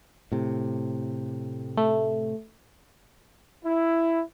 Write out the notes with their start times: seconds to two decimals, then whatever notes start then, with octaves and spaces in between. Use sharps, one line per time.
0.32 A2 C3
1.77 A3
3.64 E4